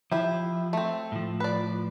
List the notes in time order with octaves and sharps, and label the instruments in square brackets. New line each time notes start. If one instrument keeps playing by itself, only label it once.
[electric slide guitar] F3 [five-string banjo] E4 G4
[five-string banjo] A3 C4
[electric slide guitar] A2 F3
[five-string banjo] B4 D5